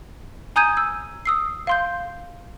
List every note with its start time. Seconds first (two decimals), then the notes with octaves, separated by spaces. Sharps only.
0.56 G#5 A#5 D#6 G6 G#6 D#7
0.77 E6
1.25 D#6 E6 C7
1.67 F5 C6 G6